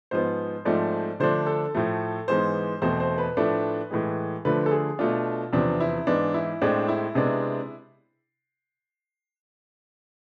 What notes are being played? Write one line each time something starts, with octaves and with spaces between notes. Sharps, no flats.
G#2 F3 B3 C5
G#2 F3 A3 C4 D5
D3 F3 A3 D4 C5
A4
A2 F3 A3
G#2 E3 G#3 B3 C5
E2 B2 A3 C4 C5
C5
B4
A2 F3 A3 D4
A2 E3 G#3
D3 F3 A3 D4 B4
A4
G#4
B2 A3 D4 F4
E2 C3 F3 B3 D4
E4
G#2 E3 B3 D4
E4
A2 G#3 C4 D4
E4
C3 G#3 B3 D4